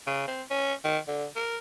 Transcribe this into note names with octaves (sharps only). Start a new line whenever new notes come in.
C#3
C4
C#4
D#3
D3
A#4